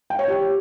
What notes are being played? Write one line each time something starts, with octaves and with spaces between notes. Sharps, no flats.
G5
C#5
G4